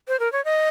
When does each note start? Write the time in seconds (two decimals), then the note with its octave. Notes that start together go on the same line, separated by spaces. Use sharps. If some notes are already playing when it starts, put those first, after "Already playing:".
0.08 C5
0.20 A#4
0.32 C#5
0.45 D#5